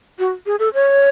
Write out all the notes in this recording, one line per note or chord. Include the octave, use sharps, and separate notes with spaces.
F#4
G#4
A4
C#5